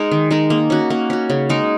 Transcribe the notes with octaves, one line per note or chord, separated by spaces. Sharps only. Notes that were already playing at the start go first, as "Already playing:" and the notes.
Already playing: G#3 D#4 A#4
D#3
G#3 D#4 A#4
A#3
C#4 F#4
A#3
C#4 F#4
C#3
G#3 D#4 A#4